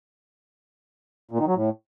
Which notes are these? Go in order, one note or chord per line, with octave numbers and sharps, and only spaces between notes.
A#2
D#3
F#3
A2